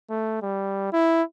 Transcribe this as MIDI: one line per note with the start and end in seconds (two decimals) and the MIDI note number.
0.10 0.38 57
0.42 0.90 55
0.93 1.23 64